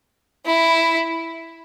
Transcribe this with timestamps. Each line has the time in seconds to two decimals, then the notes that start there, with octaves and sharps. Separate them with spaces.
0.46 E4